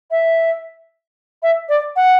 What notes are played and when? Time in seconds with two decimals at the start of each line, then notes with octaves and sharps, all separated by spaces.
0.11 E5
1.43 E5
1.69 D5
1.96 F#5